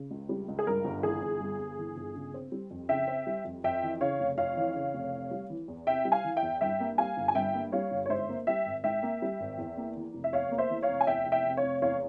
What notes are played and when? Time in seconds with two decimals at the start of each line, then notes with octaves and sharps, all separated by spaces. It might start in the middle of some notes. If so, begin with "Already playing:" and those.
Already playing: C#3
0.11 C#2
0.29 G3
0.48 C#2
0.59 G#4
0.67 G2 A#4
0.85 G1
1.03 E3 G#4
1.22 G1
1.40 G2
1.60 G1
1.78 E3
1.97 G1
2.15 C#3
2.34 C4
2.52 G3
2.71 F2
2.89 C#3 E5 G5
3.08 C4
3.27 G3
3.45 F2
3.64 F2 E5 G5
3.83 E3
4.01 C#3 C#5 F5
4.20 F1
4.38 F2 C#5 F5
4.57 E3
4.76 C#3
4.94 F1
5.13 C3
5.31 G3
5.50 E3
5.68 E2
5.87 C3 E5 G5
6.05 G3
6.12 F5 G#5
6.24 E3
6.36 E5 G5
6.43 E2
6.61 G2 E5 G5
6.80 A#3
6.98 G3 F5 G#5
7.17 G1
7.28 G#5
7.35 G2 E5 G5
7.55 A#3
7.72 G3 C#5 F5
7.91 G1
8.06 C#5
8.09 G#2 C5 E5
8.29 A#3
8.47 G3 E5 G5
8.66 G#1
8.84 G#2 E5 G5
9.03 A#3
9.22 G3
9.40 G#1
9.58 E2
9.77 A#3
9.97 E3
10.14 F1
10.24 E5
10.33 E2 C#5 F5
10.52 A#3
10.58 C5 E5
10.70 E3
10.83 C#5 F5
10.89 F1
11.01 G#5
11.07 E2 E5 G5
11.26 F1
11.32 E5 G5
11.45 C3
11.57 C#5 F5
11.63 F1
11.82 E2 C#5 F5